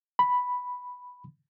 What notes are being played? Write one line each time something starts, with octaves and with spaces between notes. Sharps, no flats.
B5